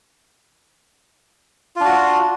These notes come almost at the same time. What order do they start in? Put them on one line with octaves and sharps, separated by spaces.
F4 D4 F#4